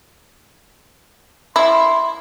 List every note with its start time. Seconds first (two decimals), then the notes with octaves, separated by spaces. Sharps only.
1.56 E4 C6